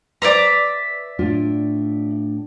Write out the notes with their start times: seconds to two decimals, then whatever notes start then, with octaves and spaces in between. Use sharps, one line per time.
0.22 B4 C5 D5 E5 A#5
1.19 A2 D4 F4